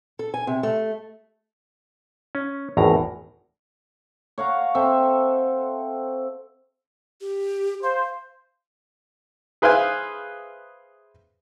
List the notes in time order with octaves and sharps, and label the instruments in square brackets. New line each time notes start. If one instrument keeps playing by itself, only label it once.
[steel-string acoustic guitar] A4
G#5
C3
A3
[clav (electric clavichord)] C#4
G#1 E2 A2 A#5
[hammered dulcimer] C#5 F5 F#5 A#5
C4 A4 E5
[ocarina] G4
[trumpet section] C5 [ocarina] F5
[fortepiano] G#4 B4 C5 E5 F5 G#5